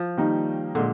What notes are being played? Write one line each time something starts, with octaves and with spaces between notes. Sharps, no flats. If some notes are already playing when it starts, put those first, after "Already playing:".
Already playing: F3
D#3 G3 A#3 D#4
A#2 D3 G#3